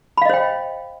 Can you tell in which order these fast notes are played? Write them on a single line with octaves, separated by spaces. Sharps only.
B5 F5 D#5 C5 G5